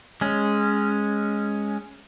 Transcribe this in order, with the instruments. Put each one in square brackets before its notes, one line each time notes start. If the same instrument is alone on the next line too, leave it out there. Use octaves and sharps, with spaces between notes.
[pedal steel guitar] G#3 C#4